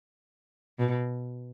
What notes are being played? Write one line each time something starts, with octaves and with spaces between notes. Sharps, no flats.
B2